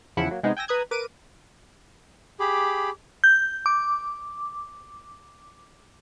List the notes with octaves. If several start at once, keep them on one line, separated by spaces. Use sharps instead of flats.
E2 C#3 F3 E4 F#5
F#3 A#3
C3 G#3 B3 D#4
G5 G#5 E6 A#6
B4 A#5 D#6 F#6 G#6
A#4 B4 D6 D7 D#7
G4 G#4 B5 D6
G6
D6